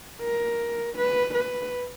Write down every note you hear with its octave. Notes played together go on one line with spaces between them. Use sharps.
A#4
B4
B4